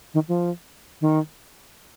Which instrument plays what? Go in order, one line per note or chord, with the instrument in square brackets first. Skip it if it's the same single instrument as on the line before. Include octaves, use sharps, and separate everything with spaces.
[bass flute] D#3
F3
D#3